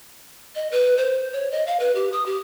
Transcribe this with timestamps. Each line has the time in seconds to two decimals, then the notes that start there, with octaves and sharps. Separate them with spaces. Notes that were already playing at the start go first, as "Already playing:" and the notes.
0.55 D#5
0.72 B4
0.97 C5
1.33 C#5
1.52 D#5
1.67 F5
1.80 B4
1.95 G4
2.13 D#6
2.26 G4